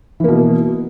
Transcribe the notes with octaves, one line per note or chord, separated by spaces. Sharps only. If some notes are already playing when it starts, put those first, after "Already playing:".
B2 E3 A#3